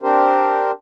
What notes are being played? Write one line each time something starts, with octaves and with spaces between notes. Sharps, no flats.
C4 D4 G4 A#4 C5